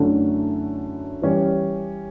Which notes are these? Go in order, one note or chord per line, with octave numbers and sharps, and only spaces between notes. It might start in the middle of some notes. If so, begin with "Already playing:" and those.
Already playing: F#2 D3 A3 C#4 E4
E3 G3 C#4 G4